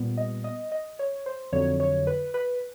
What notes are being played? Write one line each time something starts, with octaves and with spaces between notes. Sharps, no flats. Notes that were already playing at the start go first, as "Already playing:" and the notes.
Already playing: A#2 G3 B3
D#5
D#5
D#5
C#5
C5
F2 D3 F#3 C#5
C#5
B4
B4